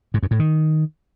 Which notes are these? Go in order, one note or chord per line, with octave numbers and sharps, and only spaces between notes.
G#2
F#2
A2
D#3